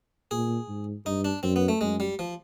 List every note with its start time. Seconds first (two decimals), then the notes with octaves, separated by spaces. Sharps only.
0.31 A#2 G#4
0.68 G#2
1.06 G2 D#4
1.25 D4
1.43 F#2 C4
1.56 B3
1.68 A3
1.81 F#2 G#3
2.00 G3
2.19 F3